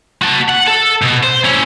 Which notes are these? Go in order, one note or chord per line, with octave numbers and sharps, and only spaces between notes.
F#4 A5
F#5
A4
B2
C5
C#4 E4